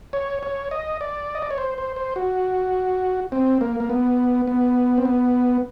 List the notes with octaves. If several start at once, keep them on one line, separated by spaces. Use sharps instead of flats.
C#5
C#5
D#5
D5
D#5
D5
C#5
C5
C5
C5
F#4
C4
A#3
A#3
B3
B3
C4
B3